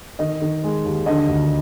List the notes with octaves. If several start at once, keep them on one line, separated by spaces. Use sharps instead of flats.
D#3 D#5
D#3
G#3
D#2
D3 D#5
D2